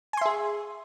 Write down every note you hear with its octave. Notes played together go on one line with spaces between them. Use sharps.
G#4 E5 G#5 C6